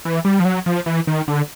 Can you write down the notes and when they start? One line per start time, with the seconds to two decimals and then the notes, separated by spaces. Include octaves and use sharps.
0.05 E3
0.25 G3
0.40 F3
0.45 F#3
0.66 F3
0.86 E3
1.07 D#3
1.28 D3